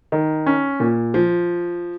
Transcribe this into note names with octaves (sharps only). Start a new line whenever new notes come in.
D#3
C#4
A#2
F3